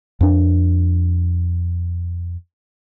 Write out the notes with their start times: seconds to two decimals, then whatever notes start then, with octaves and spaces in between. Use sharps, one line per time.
0.21 F2 D4